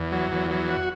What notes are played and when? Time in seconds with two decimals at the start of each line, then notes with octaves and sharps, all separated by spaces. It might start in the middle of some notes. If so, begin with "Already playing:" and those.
Already playing: E2
0.12 F#3
0.32 E2
0.51 F#3
0.70 F#4